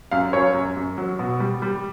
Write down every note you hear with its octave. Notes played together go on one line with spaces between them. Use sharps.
F#2 F5
F#2 C#5
F#2
F#2
F#3
B2
G3
G3